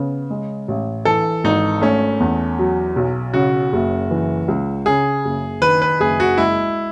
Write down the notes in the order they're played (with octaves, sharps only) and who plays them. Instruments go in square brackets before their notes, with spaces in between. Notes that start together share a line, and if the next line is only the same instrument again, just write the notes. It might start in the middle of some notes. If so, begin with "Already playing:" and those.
Already playing: [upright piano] C#3 B3
G#3
A1
[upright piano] E3 [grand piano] A4
[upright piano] G#1 [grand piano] D#4
[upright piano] A3 [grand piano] C#4
[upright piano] E2
F#3
B1
[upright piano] C#3 [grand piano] F#4
[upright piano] F#1
E3
C#2
[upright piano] C#3 [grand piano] G#4
[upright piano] F#1
[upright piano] D#3 [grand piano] B4
[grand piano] B4
[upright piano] F#1 [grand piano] G#4
[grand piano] F#4
[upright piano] G#3 [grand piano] E4